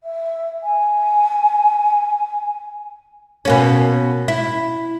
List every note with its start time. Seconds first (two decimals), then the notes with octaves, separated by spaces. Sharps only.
0.03 E5
0.63 G#5
3.45 B2 A#3 C#4
4.28 E4